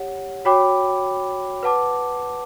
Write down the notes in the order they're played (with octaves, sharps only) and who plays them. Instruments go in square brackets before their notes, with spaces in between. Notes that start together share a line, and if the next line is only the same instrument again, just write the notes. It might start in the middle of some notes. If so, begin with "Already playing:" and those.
Already playing: [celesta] G4 C#5 F#5
F#4 C#5 G5 B5 D6
B4 F#5 A5 D6